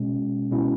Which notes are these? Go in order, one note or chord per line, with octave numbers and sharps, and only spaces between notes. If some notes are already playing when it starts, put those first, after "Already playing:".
Already playing: B2 G#3 C#4
B2 G#3 C#4 E4